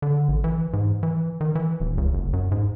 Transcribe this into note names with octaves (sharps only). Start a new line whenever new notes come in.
D3
A1
E3
G#2
E3
D#3
E3
D#1
C#2
F#1
F#2
G#2